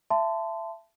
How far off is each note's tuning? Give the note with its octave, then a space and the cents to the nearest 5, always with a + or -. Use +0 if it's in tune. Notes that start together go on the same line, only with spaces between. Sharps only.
E5 +25 A5 +0 C6 -25